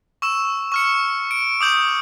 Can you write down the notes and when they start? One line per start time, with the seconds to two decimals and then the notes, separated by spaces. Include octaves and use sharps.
0.22 C#6 E6 E7
0.72 C#6 F6 C#7
1.31 D7
1.61 D6 D#6 G6 F#7